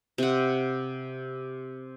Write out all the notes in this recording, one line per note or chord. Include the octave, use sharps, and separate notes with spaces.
C3 F#5